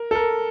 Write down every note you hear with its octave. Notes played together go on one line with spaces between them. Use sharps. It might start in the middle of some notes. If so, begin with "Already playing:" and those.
Already playing: A#4
A4
A#4